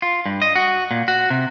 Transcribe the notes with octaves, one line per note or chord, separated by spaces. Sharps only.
F4
G2
D#5
F#4
A#2
F#4
C3